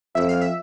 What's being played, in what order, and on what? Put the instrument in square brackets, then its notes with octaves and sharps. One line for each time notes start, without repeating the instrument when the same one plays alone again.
[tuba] F2 [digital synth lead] E5
[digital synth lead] F5
E5